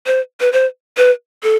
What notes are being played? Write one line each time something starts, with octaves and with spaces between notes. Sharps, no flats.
C5
B4
C5
B4
A4